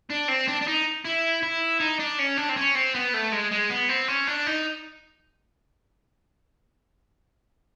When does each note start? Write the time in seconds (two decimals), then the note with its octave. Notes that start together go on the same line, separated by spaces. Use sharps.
0.10 D4
0.28 C4
0.48 D4
0.61 D4
0.67 D#4
1.05 E4
1.43 E4
1.80 D#4
2.00 D4
2.19 C#4
2.37 D4
2.49 C4
2.57 C#4
2.75 C4
2.94 B3
3.14 A3
3.32 G#3
3.52 G#3
3.70 B3
3.89 C4
4.08 C#4
4.27 D4
4.47 D#4